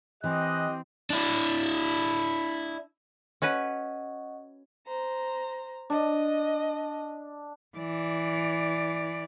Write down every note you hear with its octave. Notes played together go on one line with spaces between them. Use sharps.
E3 C4 G4 D#5 F#6
D4 E4
C#4 F#4 B4 D#5 F#5 C#6
C5 A#5
D4 D#5
E3 D5